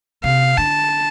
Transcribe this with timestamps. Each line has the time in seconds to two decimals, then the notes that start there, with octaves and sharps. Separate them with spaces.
0.24 C3 F5
0.57 D3 A5